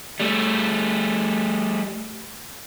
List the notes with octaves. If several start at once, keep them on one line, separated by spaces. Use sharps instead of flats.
G3 A3